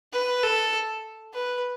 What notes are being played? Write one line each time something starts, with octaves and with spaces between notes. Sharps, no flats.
B4
A4
B4